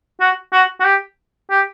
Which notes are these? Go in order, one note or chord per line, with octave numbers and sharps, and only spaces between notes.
F#4
F#4
F#4
G4
G4